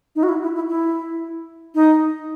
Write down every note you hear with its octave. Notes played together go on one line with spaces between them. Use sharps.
D#4
F#4
E4
E4
E4
E4
D#4